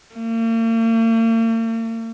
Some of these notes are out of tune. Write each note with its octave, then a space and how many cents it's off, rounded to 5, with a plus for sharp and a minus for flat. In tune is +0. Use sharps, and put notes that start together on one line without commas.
A#3 -45